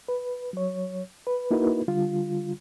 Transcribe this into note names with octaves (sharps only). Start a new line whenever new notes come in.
B4
F#3 C#5
B4
A#3 D#4 E4 F#4 A#4 B4
D3 G3 F4